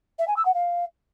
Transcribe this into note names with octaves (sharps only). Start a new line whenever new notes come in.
E5
G#5
E6
F#5
F5